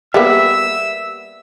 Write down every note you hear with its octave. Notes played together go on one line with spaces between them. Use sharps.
G3 A#3 B3 E5 E6